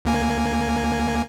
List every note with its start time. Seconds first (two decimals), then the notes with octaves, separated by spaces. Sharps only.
0.05 D2 A#3 G#5